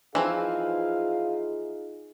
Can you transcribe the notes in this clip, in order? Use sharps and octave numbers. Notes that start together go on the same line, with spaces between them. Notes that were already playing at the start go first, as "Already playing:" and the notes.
E3 F3 C4 D#4 F4 G#4 F5